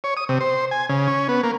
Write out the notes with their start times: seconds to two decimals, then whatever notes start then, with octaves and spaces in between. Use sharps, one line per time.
0.04 C#5
0.17 D#6
0.29 C3
0.41 C5
0.71 G#5
0.89 C#3
1.08 C#4
1.28 B3
1.43 A#3